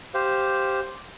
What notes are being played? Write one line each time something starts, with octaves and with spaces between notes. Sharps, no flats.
G4 C5 F5